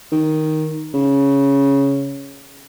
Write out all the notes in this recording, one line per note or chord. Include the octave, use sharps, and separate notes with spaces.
D#3
C#3